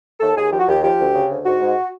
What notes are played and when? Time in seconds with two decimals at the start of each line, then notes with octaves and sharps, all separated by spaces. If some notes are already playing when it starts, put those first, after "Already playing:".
0.20 D#2 A4
0.35 D#2 G#4
0.51 F3 G4
0.59 F#4
0.67 D#2 G4
0.83 F3 G4
0.99 D2
1.14 C#3
1.30 D2
1.45 G#2 F#4
1.61 G#2